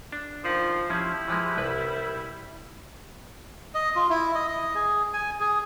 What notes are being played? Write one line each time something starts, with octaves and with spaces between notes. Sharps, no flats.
D4
D#3 F3
F3 G3 C#4 E4
E3 F3 G#3
C2 B4
D#5
F4
E4
D#5
D#5
G#4
G#5
G#4